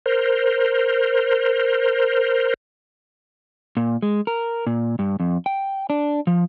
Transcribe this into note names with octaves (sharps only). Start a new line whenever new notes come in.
A#4 C5
A#2
G#3
A#4
A#2
G2
F2
G5
D4
F3